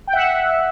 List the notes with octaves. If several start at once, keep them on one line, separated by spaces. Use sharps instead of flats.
G5
E5 F#5